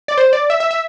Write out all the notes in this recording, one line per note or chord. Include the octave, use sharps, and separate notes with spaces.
D5
C5
D5
E5
E5
E5